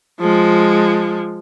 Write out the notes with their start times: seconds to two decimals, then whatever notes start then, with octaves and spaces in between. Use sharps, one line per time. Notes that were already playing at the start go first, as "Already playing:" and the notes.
0.20 F3 G#3